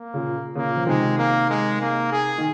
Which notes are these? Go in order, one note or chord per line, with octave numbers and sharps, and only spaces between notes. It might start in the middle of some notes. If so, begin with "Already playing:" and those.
Already playing: A#3
A#2 C#3
A#2 C#3 A#3
F3
C3 D#3 G#3
A#3
G#3
A#3
G#4
D#3